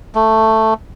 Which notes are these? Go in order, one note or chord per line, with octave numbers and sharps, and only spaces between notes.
A3